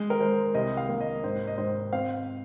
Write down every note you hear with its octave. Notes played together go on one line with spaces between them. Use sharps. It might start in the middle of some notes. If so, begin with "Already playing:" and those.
Already playing: G#3
A#4
G#3 C5
C2 D#5
F5
A#3
D#5
G#2 C5
D#5
G#2 C5
C4 F5